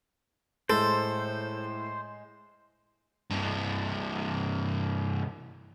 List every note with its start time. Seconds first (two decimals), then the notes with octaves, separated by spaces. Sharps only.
0.70 A2 G#3 A4 C5
3.30 C2 G2